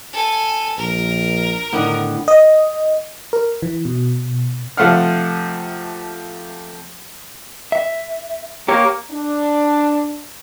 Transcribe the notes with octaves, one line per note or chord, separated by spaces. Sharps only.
A4 G#5
A#1 A#4
A2 D3 D#3 B3
D#5
A#4
E3
B2
C3 F3 A3 F5 F#5 F6
E5
A#3 G4 C#5
D4